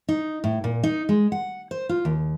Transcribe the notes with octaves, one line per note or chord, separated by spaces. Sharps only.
D#4
A2
A#2
D#4
G#3
F#5
C5
F4
D#2